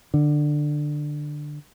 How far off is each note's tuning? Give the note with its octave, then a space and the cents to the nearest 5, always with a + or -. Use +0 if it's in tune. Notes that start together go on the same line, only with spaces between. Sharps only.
D3 +15